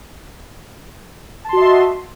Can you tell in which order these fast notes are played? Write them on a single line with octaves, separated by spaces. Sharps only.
A5 C6 F#4 D#5 E5